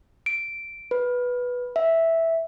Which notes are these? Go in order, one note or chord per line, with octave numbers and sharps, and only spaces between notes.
D7
B4
E5